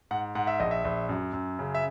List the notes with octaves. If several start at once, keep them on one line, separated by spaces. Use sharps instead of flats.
G#2 F#5
G#2 F#5
E5
A#1 D#5
E5
A#1
F#2
F#2
C#3
E5